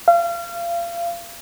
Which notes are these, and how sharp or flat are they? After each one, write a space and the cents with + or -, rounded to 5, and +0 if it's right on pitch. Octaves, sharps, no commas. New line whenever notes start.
F5 -30